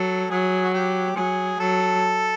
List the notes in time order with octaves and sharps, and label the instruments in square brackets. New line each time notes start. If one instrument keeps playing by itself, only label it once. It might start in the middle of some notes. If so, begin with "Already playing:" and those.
Already playing: [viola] F#3 [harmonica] A4
[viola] F#3 [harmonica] G#4
[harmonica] F#4
G4
[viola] F#3 [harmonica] G#4
[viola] F#3 [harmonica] A4